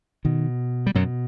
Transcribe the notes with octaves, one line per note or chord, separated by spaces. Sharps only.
B2 D#3
G3
F#2 B2 F#3